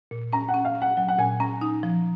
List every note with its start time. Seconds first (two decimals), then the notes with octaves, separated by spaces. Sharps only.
0.11 A#2
0.33 C#4 A#5
0.48 F#5
0.54 C#4
0.65 F5
0.75 C#4
0.82 F#5
0.97 F#3 F#5
1.08 F#5
1.18 A#2 G#5
1.40 C#4 A#5
1.61 D#4
1.83 F3